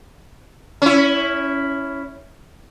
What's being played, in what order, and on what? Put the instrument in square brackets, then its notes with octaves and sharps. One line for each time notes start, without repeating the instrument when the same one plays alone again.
[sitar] C#4 E4